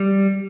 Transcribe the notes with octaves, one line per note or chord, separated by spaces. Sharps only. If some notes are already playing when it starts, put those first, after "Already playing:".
Already playing: G3